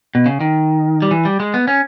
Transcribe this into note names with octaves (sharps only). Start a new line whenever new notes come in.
B2
C#3
D#3
G3
E3
G3
G#3
B3
C#4